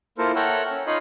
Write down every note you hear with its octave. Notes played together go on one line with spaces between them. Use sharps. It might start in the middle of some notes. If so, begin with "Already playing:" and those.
A#3 E4 F4 A4 A#4 C5
A4 A#4 C#5 E5 F#5 G5
C#4
D#4 F4 C#5 D#5 F5 B5